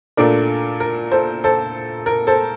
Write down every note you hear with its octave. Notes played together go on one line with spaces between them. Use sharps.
A#2 A3 D4 A#4 D5
A#4
A4 C5
A4 C5
A#4
A4 C5